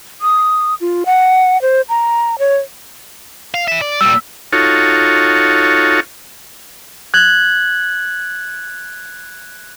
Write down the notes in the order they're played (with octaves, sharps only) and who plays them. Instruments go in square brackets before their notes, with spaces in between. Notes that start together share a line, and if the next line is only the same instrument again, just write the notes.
[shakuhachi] D#6
F4
F#5
C5
A#5
C#5
[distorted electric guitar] F5
E3 E5
D5
[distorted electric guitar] A#2 G3 [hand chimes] E6
[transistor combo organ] D#4 F4 F#4 A4 C#5
[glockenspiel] F#6 G#6 F#7